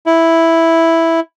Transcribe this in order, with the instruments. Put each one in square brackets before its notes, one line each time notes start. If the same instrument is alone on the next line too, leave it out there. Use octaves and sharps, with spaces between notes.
[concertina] E4